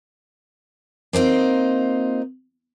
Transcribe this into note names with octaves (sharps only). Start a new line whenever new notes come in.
A#3 C4 D#4 F4